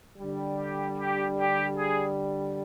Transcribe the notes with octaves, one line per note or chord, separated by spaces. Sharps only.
D3 G3
G4
G4
G4
G#4